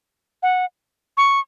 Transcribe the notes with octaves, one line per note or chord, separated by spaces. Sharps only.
F#5
C#6